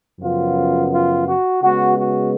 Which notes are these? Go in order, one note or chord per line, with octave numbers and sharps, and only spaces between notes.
F#2 C#3 F3 B3 F4
F4
F#4
C#3 G#3 B3 F#4
F#4